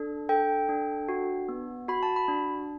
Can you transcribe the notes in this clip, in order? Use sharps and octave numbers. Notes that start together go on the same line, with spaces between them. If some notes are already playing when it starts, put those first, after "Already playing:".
Already playing: D4 A4
A4 G5
D4
F#4
B3
F#4 B5
A5
B5
D4